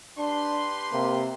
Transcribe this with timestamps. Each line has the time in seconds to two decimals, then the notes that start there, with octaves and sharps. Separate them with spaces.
0.18 D4 G4 B4 C6
0.93 C3 A#3